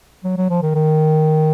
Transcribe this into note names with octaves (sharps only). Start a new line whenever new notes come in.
F#3
F#3
F3
D#3
D#3